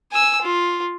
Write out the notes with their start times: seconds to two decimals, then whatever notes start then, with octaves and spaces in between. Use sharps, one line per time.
0.13 G#5 E6
0.42 F4